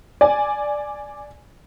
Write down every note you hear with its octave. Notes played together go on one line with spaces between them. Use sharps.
D5 G#5